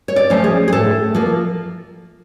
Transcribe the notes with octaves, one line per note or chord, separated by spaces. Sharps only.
C#5
D5
F3 A3 C#4
G#4
G#4
A2 A4
F3 A#3